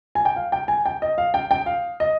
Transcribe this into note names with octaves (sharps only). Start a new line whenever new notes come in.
G#5
G5
F5
G5
G#5
G5
D#5
F5
G5
G5
F5
D#5